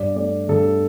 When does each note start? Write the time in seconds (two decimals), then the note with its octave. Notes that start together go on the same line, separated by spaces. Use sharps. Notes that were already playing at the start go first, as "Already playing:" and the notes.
Already playing: G2 D5
0.16 A3 D5
0.49 G2 A4